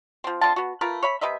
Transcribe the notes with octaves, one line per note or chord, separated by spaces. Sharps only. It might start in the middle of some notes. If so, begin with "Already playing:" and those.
F3 C4
D3 C4 F4 A5
B3 F#4
A3 F4 A#4 B4
C#5 E5 B5
C3 B4 D#5 E5